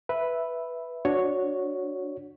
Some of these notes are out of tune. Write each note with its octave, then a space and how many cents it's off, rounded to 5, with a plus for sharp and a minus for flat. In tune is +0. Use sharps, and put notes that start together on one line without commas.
B4 +0 E5 +0
D4 -10 F#4 -10 C#5 +0